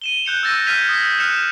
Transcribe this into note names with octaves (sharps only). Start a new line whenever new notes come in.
D#7 E7 G7
F#6 G6 C#7 F7
E6 G6 A6 A#6 D#7
F6 G6 G#6 B6 D#7 F7
D#6 A#6 B6
F6 F#6 C#7 E7 F7